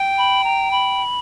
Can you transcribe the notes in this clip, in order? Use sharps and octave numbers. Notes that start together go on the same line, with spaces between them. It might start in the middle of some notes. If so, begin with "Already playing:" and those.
Already playing: G5
B5
A#5
B5